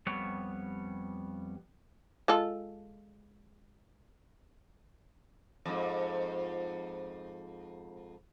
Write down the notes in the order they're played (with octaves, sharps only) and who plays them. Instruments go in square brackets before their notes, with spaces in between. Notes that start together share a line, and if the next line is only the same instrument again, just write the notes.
[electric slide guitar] F2 G3 B3 C#5
[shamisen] G#3 F4 A4
[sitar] F2 G#2